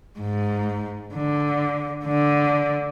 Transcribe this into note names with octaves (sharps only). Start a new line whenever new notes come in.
G#2
D3
D3